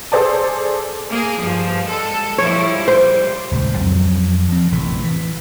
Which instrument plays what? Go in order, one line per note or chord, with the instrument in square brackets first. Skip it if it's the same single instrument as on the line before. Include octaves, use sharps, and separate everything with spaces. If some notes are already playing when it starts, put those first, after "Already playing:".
[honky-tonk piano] G#4 A4 C5 D5 A5
[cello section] A#3 G#4
G2 F3
G#3 A4
[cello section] F3 G3 E4 [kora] C#5
[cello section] G3 [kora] C5
[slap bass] D#1 C#2 A2
F2 F#3 C4
F3 C4
A1 C3 E3
E3